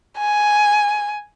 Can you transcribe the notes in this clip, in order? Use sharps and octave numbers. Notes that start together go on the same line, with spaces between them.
G#5